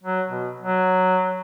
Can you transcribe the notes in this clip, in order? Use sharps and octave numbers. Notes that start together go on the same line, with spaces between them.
F#3
B2
F#3